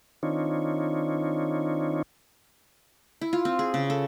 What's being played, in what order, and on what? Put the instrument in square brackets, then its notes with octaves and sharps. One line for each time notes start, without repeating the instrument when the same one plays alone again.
[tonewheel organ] D#3 C4 D4 D#4 F4 C#5
[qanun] E4
F4
C4
G#4
C#3
A4